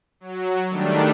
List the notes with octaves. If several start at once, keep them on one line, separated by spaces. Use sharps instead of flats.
F#3
D#3 G3 A3 D4